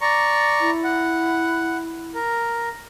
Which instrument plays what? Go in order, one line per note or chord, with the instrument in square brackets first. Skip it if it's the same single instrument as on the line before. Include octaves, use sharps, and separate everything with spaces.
[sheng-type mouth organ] D5 A#5 C#6
[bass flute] E4
[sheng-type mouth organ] F#5
A#4